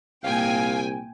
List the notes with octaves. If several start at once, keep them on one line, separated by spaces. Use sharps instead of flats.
C2 A#2 F5 G5 G#5